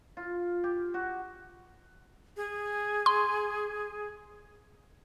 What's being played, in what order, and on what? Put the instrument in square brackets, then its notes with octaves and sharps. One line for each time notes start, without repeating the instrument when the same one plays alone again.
[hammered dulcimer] F4
G4
F#4
[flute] G#4
[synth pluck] C6